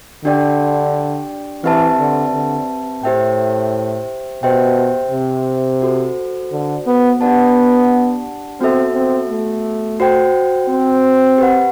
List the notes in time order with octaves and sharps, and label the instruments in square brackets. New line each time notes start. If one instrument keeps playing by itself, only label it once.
[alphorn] D3 [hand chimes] D4 G4 D5 G5
[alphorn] E3 [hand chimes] C4 G4 B4 E5 A5
[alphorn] D3
D3
[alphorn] A2 [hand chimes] G4 C5 E5 G5
[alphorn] B2 [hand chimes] G4 C5 E5 G5
[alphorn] C3
[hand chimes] F#4 A4 C5
[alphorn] D3
B3
[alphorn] B3 [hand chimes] D4 G4 D5 F#5 A5
[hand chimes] B3 F#4 A4 E5 [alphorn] C4
[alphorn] C4
A3
[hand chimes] F#4 C5 G5
[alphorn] C4
[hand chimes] G4 B4 F#5